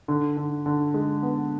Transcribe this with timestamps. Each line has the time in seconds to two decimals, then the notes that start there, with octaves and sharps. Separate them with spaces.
0.08 D3
0.37 D3
0.66 D3
0.94 G#3
1.23 B3